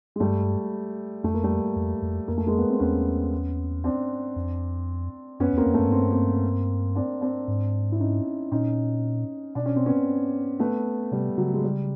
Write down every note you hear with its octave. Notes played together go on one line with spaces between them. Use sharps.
G#3
G2 G3 A3
F2 A3
A#3
G3 A3
F2
F2
F2 A#3
A3
G#3 A#3
B3
C4
E2 B3 C#4
C4 D4
F2
F#2 B3 C#4
E2
A#3 C4
F2
F#2 A3 B3
G#2
G2 C4
B3
A#3 C4
C4 D4
C4 D4
G#2
E4
C#4 D#4
A#2 C#4 D#4
B2 D4
C#4
C4
B3 C#4
A3 B3
C3 G3
C#3 F#3
G#3
G3